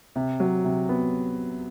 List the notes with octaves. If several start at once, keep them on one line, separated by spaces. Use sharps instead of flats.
C3
F#3
C3
B3